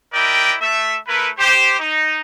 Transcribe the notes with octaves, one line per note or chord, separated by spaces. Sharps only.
E4 G4 A#4 D5 D#5 G5
A3 E5
A3 E4 A#4 B4
G4 C5
D#4